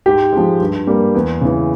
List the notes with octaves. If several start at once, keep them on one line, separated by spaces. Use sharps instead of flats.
G#2 G4
F3 G#3
G2
G3 A#3
E2
C#3 E3